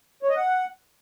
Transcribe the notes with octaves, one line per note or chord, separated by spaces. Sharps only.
C#5
D#5
F#5